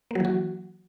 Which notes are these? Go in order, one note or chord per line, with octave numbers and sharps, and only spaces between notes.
E3 F#3 A#3 F#4